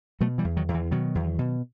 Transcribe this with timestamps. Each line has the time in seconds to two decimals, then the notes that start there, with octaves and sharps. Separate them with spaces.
0.21 B2 F#3 A3
0.38 E3 G3
0.44 E2
0.57 D#3 F#3
0.69 E2
0.74 E3
0.91 B2 D#3 F#3
1.15 E2
1.39 B2